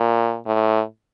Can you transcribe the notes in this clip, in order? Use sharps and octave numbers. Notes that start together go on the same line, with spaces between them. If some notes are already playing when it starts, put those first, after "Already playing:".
Already playing: A#2
A2